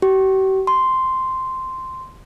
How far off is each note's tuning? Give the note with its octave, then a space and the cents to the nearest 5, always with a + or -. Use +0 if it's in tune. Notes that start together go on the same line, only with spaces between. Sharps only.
G4 -45
C6 -5